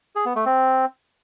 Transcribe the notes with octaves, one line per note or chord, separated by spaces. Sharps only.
G#4
B3
A3
C4